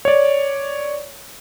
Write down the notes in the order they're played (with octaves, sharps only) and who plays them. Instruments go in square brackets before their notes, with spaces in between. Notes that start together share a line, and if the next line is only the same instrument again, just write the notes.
[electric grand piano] C#5 D5